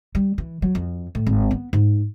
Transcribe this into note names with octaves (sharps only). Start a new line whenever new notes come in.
G3
E3
F#3
F2
A2
G#1
B3
G#2